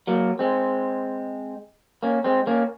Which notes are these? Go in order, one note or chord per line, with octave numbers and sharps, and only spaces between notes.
F#3 A#3
G#3 C4
A#3 C#4
G#3 C4
A#3 C#4